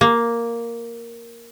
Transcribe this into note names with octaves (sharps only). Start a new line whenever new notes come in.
A#3